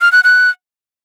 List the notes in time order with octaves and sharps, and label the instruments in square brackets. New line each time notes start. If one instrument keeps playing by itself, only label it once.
[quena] F6
F#6
F#6